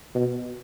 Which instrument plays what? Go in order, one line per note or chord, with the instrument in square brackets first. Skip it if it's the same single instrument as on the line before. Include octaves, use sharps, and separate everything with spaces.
[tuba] B2